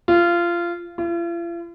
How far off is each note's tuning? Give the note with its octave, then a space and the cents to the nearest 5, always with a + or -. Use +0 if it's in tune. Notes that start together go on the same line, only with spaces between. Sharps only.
F4 -20
F4 -45